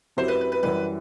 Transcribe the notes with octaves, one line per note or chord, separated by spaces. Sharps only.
F#2 F#3 C4 E4 G4 C5
B4
B4
B4
F#2 E3 G3 B4